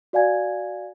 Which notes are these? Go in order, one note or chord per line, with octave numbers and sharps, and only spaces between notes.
F#4 D5 F5 G#5 G#6